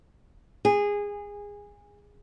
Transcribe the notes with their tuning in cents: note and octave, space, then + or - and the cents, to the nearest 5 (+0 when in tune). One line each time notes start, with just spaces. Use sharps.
G#4 -20